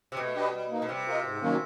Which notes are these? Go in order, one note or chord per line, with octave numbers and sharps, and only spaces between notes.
C3
B2 A3
D4 G4 B4 D#5
G3
A#3 D#4
B2
C3 G3
C4 F4 A#4 D#5
G#2
D#3 F#3 A#3 C#4